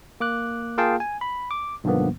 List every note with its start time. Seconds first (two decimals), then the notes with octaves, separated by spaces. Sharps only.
0.20 A#3 D6 F#6
0.78 A#3 F4 G#4 F5 G5 A5
1.00 G#5
1.21 B5
1.51 D6
1.84 B1 G2 D3 F3 A#3 B3